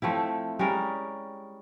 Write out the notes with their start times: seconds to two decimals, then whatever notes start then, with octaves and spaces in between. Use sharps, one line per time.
0.02 F3 A3 C4 E4
0.59 G3 G#3 C#4 A#4